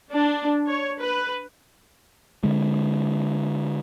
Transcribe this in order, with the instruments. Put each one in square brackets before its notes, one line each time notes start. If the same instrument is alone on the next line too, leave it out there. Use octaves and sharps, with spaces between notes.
[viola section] D4
C#5
B4
[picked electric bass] D3 G#3